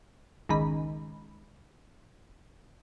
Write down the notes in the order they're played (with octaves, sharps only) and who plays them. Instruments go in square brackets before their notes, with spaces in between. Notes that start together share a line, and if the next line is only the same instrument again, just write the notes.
[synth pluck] G#1 C#2 D#3 B5